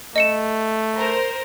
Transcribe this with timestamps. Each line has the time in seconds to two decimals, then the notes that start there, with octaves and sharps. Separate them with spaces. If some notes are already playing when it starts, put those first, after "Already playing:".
0.16 A3 D#5 C#7 E7
0.96 A#4 C5